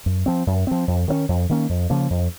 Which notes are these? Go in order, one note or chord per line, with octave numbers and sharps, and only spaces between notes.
F#2
F3 C4
F#2
F3 C4
F2
D#3 A#3 C#4
F2
D#3 A#3 C#4
F2
C#3 F3 A#3
F2